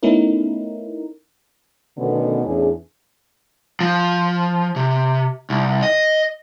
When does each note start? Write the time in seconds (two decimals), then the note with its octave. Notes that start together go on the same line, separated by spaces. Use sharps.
0.03 A3 B3 C#4 D#4 E4 A#4
1.98 B2 D3 D#3 A3 B3 C#4
2.44 E2 A2 C#4 D4 G#4
3.81 F3
4.76 C3
5.50 C2
5.83 D#5